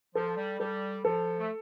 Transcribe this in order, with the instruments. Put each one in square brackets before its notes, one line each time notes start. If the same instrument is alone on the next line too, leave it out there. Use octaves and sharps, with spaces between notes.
[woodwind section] F3 [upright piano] A4
[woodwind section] G3
[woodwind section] G3 [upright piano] A4
[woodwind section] F3 [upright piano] A4
[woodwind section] A3